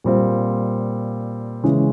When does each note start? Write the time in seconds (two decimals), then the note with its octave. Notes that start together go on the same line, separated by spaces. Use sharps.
0.04 A#2 G3 C4 F4
1.64 C#3 E3 G#3 C#4